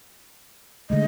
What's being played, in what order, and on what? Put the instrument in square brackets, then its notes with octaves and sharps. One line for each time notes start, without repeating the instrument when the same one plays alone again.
[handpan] D3 G#3 A3 [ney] D#5